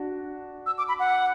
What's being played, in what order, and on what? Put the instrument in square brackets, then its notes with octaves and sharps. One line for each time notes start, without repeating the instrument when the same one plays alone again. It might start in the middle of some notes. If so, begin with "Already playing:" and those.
Already playing: [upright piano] D4 F#4
[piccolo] E6
D6
B5
F#5